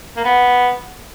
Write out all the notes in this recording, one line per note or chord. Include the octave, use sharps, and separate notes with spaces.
A#3
B3